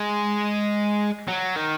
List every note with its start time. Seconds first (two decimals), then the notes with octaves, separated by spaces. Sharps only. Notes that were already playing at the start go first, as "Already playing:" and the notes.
Already playing: G#3
1.28 F#3
1.56 D#3